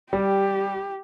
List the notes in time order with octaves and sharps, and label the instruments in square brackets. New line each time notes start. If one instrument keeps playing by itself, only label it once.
[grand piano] G3 [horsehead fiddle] G4